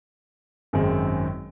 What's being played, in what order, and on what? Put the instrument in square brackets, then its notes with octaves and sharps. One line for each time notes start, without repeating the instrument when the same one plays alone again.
[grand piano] G#1 F#2 D#3 G#3 C4